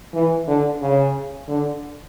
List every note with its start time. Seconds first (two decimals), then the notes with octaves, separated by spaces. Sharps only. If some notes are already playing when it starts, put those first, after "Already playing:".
0.14 E3
0.48 D3
0.82 C#3
1.49 D3